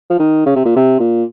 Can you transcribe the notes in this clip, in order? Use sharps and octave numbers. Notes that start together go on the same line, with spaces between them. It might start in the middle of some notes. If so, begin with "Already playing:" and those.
F3
D#3
C#3
C3
A#2
C3
A#2